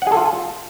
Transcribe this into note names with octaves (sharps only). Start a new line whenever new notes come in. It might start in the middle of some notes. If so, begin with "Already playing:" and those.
F#5
G#4
A4
F4